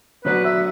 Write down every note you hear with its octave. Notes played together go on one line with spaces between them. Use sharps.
D3 F#3 B3 F#4 B4 D5
E5